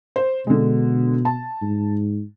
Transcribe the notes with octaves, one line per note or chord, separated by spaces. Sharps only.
C5
B2 D3 G#3
A5
G#2